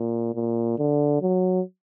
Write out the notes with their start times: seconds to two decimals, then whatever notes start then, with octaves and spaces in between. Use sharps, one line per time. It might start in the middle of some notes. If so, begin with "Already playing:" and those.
Already playing: A#2
0.35 A#2
0.78 D3
1.22 F#3